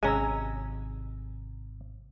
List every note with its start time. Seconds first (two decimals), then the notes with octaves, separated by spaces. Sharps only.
0.03 G#1 C3 G#3 C#4 G#5 A#5 E6